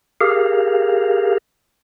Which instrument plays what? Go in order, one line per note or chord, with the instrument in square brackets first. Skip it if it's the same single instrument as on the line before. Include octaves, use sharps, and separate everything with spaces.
[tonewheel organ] G4 G#4 A#4 F5